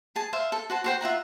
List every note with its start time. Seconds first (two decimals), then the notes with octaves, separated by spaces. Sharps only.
0.16 G#4 A5
0.33 C5 E5 F5
0.52 A4
0.70 F#4 C5 A5
0.84 F#4 C5 G5
1.01 F4 E5 F#5 A#5